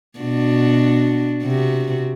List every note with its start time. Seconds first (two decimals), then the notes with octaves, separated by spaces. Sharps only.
0.19 B2 D4 F#4
1.43 C3 F#4